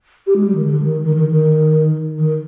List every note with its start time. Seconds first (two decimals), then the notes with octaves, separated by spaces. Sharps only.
0.27 G4
0.36 G#3
0.46 G3
0.55 D#3
0.65 D3
0.80 F3
0.83 D#3
1.03 D#3
1.16 D#3
1.29 D#3
2.18 D#3